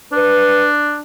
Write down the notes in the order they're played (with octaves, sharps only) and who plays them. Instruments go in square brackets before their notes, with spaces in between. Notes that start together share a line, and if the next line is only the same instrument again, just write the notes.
[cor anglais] D4 [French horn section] B4